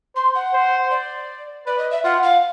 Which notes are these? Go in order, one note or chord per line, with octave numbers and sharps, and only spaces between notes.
C5 C6
F#5
C5
D5
B4 D5
D#5
E5
F4 F#5
F5